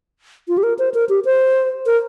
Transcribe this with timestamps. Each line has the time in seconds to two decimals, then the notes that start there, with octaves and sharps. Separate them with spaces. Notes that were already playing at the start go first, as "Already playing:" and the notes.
0.48 F4
0.58 G4
0.63 A#4
0.79 C5
0.94 A#4
1.09 G4
1.25 C5
1.86 A#4